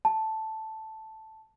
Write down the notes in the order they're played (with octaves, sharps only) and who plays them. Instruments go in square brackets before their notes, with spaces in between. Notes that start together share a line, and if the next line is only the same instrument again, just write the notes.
[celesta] A5